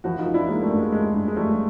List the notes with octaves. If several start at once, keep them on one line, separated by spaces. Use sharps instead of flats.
F3 E4 F#4
D#4 F4
F3
D4 E4
F3 G#3 A#3
G3 A3
G2
G#3
G2 G#3
G2
G#3
F3 G3 A3